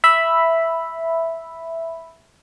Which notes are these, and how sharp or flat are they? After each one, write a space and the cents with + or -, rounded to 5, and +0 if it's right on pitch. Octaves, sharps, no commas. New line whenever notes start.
E5 +0 B5 +0